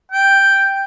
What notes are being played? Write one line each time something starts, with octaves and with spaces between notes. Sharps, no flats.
G5